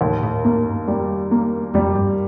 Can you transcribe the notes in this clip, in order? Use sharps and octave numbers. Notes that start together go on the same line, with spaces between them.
D#2 A2
A2
A2 A#3
G2
F2 G3
A#3
F2 G3
G2